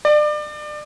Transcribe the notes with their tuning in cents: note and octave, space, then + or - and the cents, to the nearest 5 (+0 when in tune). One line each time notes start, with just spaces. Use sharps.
D5 +30